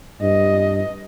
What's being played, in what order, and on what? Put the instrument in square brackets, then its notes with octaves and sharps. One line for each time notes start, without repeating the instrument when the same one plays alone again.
[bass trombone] G2 [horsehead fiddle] D#5